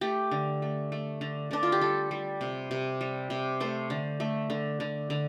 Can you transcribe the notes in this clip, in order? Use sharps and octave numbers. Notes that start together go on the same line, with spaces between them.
A3 G4
D3
A3
A3
D3
D3 D4
F4
G4
G3 A4
G3
C3
C3
G3
C3
A3 C5
D3
A3
D3
D3
D3